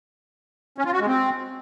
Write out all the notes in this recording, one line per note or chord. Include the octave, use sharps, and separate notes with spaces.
C#4
F4
F#4
G#3
C4